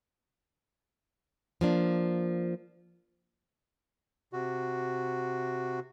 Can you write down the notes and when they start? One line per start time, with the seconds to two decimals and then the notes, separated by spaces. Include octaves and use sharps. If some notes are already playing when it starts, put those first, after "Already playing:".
1.61 F3 A#3 D4
4.33 C3 F#4